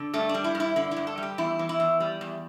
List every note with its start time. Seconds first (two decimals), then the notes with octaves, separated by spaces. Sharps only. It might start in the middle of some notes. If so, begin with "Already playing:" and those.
Already playing: D3
0.13 G2 A3
0.29 D4
0.34 G3
0.44 E4
0.55 G2
0.60 E4
0.76 D3 E4
0.91 E4
0.97 G2
1.07 A4
1.18 G3
1.23 G4
1.38 E2 E4
1.59 E3
1.69 E4
1.80 E2
2.00 G3
2.21 E2